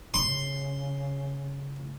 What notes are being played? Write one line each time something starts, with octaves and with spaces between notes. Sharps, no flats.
C#3 C6